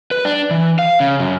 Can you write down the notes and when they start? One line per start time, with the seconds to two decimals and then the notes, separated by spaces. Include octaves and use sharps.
0.11 B4
0.25 D4
0.50 E3
0.79 F5
1.00 C#3
1.20 F#2